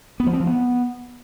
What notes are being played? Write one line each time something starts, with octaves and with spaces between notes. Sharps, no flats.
B3
F3
C4
F3
B3